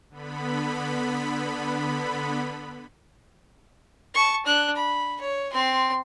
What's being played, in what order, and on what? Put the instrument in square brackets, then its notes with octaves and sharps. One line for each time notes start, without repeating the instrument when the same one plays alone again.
[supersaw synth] D3 B3 B5
[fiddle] A5 C#6
D4 F#6
B5
C#5
C4 C6